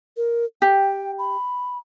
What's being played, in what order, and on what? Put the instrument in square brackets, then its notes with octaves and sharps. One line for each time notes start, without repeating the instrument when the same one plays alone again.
[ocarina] A#4
[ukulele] G4 [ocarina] G5
[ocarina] B5